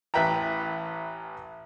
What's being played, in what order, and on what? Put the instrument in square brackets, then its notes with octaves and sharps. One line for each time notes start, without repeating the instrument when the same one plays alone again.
[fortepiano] A1 E3 B4 E5 G5 A#5